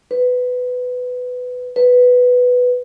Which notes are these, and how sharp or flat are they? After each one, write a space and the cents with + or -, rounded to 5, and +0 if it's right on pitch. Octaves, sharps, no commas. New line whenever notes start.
B4 +15
B4 +5